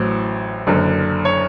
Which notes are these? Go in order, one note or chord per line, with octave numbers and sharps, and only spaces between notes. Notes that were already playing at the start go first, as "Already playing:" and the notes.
Already playing: A1 A2 F#3 C5
F#1 F#2 D3
C#5